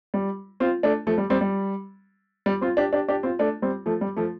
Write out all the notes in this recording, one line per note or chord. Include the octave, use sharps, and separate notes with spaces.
G3
C4 F4
A3 D4
F3 A3
G3
G3 C4
G3
G3
C4 F4
D4 G4
D4 G4
D4 G4
C4 F4
A3 D4
G3 C4
F3 A3
G3
F3 A3